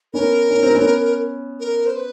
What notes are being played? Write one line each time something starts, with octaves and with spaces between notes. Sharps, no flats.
B3 C#4 A#4
C#4
C4
B3 C#4
A#4
C5
B4